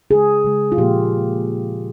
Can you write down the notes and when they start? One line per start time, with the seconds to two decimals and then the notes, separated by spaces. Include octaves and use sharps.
0.10 C#3 G#3 G#4
0.44 C#3 G#3
0.72 F4
0.78 A#2 F3 A#3 G4